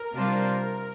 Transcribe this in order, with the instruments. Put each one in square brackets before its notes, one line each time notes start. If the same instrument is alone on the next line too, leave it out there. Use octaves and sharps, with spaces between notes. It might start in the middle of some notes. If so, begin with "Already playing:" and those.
Already playing: [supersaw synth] A#4
[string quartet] C3 G3 D4 F4 C5